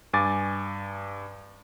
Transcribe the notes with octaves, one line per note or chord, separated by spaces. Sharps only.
G2 G#5 D6 A6